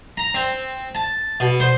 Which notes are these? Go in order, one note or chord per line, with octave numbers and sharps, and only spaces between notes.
A#5
C4
A5
B2
C5